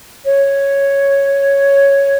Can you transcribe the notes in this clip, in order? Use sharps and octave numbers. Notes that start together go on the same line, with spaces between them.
C#5